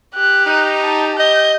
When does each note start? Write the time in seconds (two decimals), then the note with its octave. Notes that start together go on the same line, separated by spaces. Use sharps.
0.15 G4 F#6
0.45 D#4
0.84 A5
1.19 D#5 G6